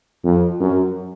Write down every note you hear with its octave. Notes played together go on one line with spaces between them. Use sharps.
F2
F#2